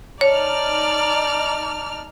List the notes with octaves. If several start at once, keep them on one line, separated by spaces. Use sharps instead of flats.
D#4 C#5 D5 A5 F6